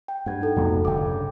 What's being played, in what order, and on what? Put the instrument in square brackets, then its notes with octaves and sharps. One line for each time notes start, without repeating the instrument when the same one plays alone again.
[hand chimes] G5
[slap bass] G2 [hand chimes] F#5 G#6
[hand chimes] D#4 A4
[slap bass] C2 F2 A#3 [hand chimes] F#4 A4
[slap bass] F1 G2 D3 [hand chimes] G5 D6
[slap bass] G2 C#3